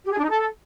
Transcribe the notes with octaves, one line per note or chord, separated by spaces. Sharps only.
G4
G#4
D4
D#4
A4